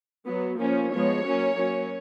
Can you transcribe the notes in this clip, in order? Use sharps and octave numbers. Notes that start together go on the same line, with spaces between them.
F#3 B3
F3 A#3 C#4
F3 G#3 B3 C#5
F#3 A#3 C#4
F#3 A#3 C#4